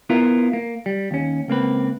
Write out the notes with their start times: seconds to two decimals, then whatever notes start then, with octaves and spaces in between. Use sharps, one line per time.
0.10 B3 E4 F4 A#4
0.53 A#3
0.86 G3
1.11 D#2 C#4
1.48 C#2 A#3 C4 B4